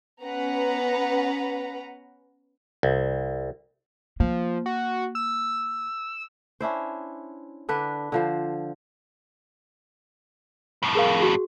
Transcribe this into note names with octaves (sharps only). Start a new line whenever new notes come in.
B3 C#4 B4 F#5 A#5
C2
F3 A#3
F#4
E6
C#4 D4 E4 C5
D3 D4 B4
D3 F3 C5
F2 A2
G#4 A#4 F5
F#4 G#4